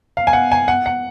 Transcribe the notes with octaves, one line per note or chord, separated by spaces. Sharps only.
F5
G#5
F#5
G#5
F#5
F#5